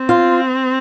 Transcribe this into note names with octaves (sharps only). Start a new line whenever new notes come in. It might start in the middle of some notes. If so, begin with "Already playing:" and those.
Already playing: C4
F4